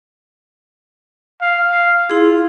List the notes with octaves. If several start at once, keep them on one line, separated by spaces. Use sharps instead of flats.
F5
F5
E4 F4 G#4